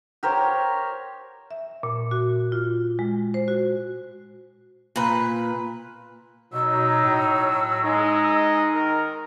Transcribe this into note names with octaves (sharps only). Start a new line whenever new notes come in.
G4 A#4 C5 C#5
E5
A#2
F#4
F4
G#3
C5
F#4
A#2 B4
F#2 B2 F#3 D#4 E6
A2
G#3 D#4 D#5
D#3 A#4